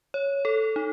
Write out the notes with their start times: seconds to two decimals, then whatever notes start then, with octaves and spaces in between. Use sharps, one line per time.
0.14 C#5
0.45 A4
0.76 D#4